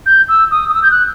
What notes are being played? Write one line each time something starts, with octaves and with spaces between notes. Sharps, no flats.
G6
E6
D#6
D#6
E6
G6
F#6